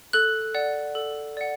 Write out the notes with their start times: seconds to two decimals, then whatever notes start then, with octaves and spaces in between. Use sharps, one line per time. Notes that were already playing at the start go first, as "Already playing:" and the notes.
0.13 A4 F#6
0.55 D5 F#5
0.95 A4
1.37 D5 F#5